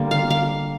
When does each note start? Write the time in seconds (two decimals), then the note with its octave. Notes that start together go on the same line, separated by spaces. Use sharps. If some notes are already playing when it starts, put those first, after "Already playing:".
Already playing: D3 G3 A#3
0.11 F5
0.30 F5